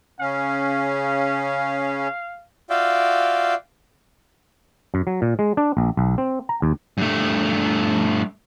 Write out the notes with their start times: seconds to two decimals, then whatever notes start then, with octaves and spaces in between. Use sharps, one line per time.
0.20 C#3 C#4 F5
2.70 F4 F#4 D5 E5 F5 G5
4.94 F#2
5.07 F#3
5.22 A#2
5.39 G#3
5.57 D4
5.77 A#1
5.97 B1
6.18 C4
6.49 A#5
6.62 D#2
6.98 G2 A3